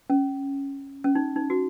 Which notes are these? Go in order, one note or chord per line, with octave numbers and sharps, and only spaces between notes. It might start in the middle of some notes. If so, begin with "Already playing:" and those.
C#4
C#4
D#4
D#4
F#4